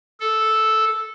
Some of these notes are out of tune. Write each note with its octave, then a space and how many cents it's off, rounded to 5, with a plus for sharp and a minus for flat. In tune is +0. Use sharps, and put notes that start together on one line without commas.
A4 -5